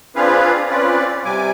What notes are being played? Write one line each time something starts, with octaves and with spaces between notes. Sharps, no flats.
C4 D4 F4 G#4 B4 F5
C4 C#4 F4 B4 D5
C3 G3 G#5 D6